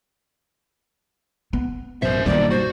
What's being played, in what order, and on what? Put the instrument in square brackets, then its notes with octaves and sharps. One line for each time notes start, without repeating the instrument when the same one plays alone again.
[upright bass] B3
[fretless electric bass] A1 F#2 B2 [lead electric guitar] A#4 E5 [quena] C5
[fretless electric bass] B1 G2 A#2 [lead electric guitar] D3 D#3 [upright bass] G3 [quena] D5
[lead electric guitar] F#4 [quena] C5